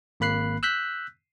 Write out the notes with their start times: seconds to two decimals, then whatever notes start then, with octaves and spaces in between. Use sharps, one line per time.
0.20 G#1 A#3 B5 F#6 C7
0.63 E6 F#6 G6 B6